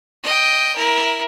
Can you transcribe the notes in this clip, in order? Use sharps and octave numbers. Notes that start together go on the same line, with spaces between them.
D#5 G5
E4 A#4